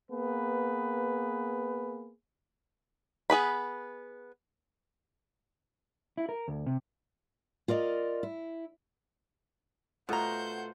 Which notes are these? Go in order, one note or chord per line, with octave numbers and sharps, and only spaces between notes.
A#3 B3 G#4 B4
B3 G#4 B4 B5
E4
A#4
D2
C3
F4 A#4 D5 D#5
E4
B2 A3 F4 C5 F#5 A#5 G6